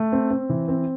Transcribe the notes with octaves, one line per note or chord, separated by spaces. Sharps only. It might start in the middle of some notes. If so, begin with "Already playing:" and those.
Already playing: A3
C4
C4
E3
C4